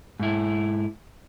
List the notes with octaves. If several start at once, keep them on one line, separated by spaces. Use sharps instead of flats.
G#2 E4